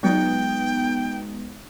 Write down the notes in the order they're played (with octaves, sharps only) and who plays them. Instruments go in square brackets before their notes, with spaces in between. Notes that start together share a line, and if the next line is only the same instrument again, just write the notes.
[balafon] F#3 [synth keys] G#3 B3 [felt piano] D#4 F4 F#4 [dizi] G5